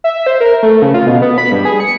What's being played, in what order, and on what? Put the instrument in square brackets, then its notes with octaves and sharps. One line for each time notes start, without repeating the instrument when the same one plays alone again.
[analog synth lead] E5
C5
A#4
A3
C#3
F4
B2
B3
B5
G2
G#4
C#7